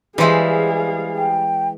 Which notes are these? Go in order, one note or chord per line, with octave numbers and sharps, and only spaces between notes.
E3 G3 G#3 G#4 C5 E5 F5
G5